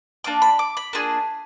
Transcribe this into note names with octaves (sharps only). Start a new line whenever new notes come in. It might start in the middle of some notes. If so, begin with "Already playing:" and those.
A#3 D4 F4 D6
B5
D6
B5
A#3 D4 F4 G#4